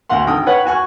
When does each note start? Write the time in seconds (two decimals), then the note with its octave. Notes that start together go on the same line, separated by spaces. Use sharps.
0.10 D2 F#4 F5 F#5 C6
0.26 G#1 D3 G5 D#6
0.46 B4 C#5 F#5 G5
0.65 F#4 G#5 C#6 F#6